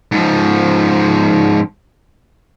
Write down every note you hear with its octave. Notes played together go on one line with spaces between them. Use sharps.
G#2 F3